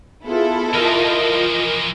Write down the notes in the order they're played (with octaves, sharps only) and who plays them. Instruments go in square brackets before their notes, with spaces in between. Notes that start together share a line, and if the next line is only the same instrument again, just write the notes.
[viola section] B3 F4 G#4 [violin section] E4 A4
[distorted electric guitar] E3 F3 [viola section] F4 D#5 [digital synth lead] A#4